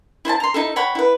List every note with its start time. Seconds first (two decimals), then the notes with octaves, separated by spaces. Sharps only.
0.25 E4 C5 G#5 A5
0.40 A#5 C6
0.54 D#4 E4 A4
0.76 C#5 F#5 G5 B5
0.95 E4 B4